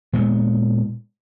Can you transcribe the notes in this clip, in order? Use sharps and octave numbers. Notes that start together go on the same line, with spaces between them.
A#2 G#3 B3